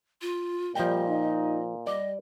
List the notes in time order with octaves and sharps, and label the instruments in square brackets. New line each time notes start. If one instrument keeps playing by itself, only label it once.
[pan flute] F4
[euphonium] A#2 [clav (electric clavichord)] F3 G5 [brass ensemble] G3 [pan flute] D#5
[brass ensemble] D#4
[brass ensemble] G3 [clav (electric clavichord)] D5 [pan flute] D#5